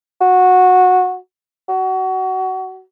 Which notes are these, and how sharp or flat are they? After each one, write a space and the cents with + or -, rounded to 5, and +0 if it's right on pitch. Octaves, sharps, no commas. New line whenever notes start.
F#4 -15
F#4 +25